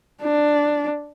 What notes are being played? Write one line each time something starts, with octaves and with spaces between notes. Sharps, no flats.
D4